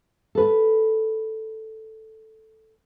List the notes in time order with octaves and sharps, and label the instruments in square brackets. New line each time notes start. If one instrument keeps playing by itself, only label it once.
[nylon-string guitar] A4 B4